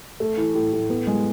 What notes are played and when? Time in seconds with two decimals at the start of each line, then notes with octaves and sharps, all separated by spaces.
0.20 A3
0.37 E3
0.55 A2
0.73 A2
0.90 B3
1.07 G#3